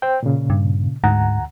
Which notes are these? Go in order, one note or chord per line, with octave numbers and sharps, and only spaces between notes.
C5 G5
A#2 C#3
G2
D2 G#2 F#5 A#5